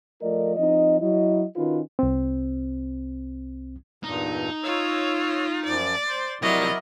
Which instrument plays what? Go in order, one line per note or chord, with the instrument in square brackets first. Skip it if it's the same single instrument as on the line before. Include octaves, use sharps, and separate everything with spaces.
[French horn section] F3 A3 F4 A#4 D5 D#5
F3 C4 D#4 D#5
F#3 E4 D#5
D#3 C#4 D#4 F4 F#4 B4
[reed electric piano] C2 C4
[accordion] E2 G2 A#2 [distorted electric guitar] D#4
[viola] F4 [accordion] C#5 E6
[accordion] F#2 F3 F#3 [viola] D5
[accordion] C5 C6
[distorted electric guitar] C3 F3 [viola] F#3 D#5 [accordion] E4 A#4 D5